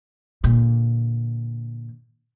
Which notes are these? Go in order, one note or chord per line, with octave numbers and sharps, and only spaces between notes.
A#2 D3